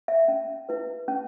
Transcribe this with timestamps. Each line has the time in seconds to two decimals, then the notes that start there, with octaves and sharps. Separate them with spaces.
0.08 E5
0.28 C#4
0.69 E4 B4
1.08 C#4